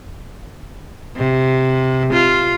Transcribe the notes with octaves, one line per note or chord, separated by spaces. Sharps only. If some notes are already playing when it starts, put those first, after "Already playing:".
C3
F4